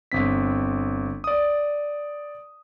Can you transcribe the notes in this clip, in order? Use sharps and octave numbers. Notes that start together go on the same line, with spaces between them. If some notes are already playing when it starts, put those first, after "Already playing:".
G1 C4 B6
D5 D#6